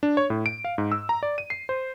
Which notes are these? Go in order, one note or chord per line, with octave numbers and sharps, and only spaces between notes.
D4
C#5
A2
D7
F5
G#2
E6
A#5
D5
D#7
C7
C5